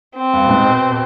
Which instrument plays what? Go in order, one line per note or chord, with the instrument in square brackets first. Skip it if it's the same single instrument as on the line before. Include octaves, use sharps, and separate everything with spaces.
[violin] C4
[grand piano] G2
B2
G#2
B2
B2